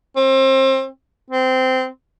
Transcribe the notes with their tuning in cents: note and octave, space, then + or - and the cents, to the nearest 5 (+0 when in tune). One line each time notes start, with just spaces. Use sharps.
C4 +30
C4 -15